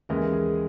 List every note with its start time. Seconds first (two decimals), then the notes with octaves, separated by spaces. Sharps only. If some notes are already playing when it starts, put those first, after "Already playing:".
0.09 D#2 C#3 E3 G#3 A#4
0.33 G#4